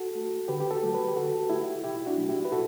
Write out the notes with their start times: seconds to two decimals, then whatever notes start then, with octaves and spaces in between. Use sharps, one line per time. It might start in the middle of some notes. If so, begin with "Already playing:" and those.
Already playing: F#4 A4
0.15 A3
0.48 D3 G4 B4
0.60 G4
0.71 F#4 A4
0.83 F#3 A3
0.93 G4 B4
1.08 G4
1.16 D3 F#4 A4
1.50 A3 E4 G4
1.84 B2 E4 G4
2.06 D4 F#4
2.18 F#3 A3
2.29 E4 G4
2.45 B4
2.52 B2 F#4 A4